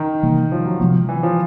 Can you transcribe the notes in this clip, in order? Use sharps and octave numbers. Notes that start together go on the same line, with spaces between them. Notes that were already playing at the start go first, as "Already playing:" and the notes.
Already playing: D#3
C3 E3 G3 A#3
F3
F#3
C3 F3 G#3 B3
E3
F3